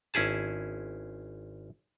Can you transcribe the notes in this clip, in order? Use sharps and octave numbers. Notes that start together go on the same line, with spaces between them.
G#1 C#4 E4 G#4 A5